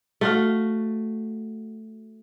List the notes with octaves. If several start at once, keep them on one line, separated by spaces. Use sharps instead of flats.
A3 F#4 F5